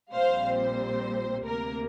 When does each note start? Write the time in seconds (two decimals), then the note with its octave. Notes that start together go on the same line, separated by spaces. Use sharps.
0.14 A#1 A#2 G3 C4 C5 F5
0.47 C5
1.45 D2 C3 A#3 A#4